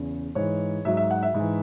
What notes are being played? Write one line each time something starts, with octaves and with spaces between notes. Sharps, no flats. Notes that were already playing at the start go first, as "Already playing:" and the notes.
Already playing: E2 C#3
G#2 E3 C#5
G#2 F#3 E5
E5
F#5
E5
G#2 E3